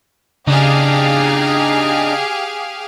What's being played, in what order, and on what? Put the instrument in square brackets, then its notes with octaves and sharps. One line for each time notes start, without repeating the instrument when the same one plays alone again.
[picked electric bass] C#3 [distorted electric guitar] D4 D#4 [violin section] G4 G#4 F5